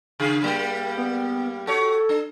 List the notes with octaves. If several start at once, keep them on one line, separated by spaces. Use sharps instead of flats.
C#3 G#4
G2 G3 A#3
B3
F#4 A4 C#5
D4